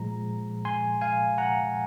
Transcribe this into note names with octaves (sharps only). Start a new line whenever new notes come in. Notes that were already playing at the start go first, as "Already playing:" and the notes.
Already playing: A#2 F3 G#3 A#5
G#5 C6
F5 G#5
F#5 A#5